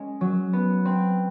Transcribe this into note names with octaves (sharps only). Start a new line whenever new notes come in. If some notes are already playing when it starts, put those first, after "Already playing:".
Already playing: G#3 C#4
F#3
B3
C4